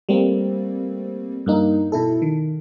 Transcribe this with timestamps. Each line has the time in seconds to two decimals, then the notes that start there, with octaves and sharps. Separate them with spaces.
0.09 G3 A3 A#3 C4
1.46 G2 A#3 D#4
1.92 B2 E4 A4
2.22 D#3